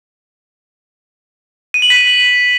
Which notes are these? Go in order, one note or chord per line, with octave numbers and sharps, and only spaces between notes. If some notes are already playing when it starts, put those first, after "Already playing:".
D#7
F#7
B6